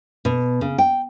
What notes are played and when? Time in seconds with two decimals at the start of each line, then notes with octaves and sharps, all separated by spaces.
0.25 B2
0.61 C#3
0.78 G5